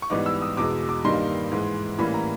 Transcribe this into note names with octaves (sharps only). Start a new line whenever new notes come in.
C#6
G#2 E3 G3 B3 D#4 D6
E6
D#6
E2 B2 G#3 D6
D6
G2 D#3 G3 A#3 D#4 C6
G#2 E3 G#3
A2 E3 G3 A#3 C#4 B5
A#5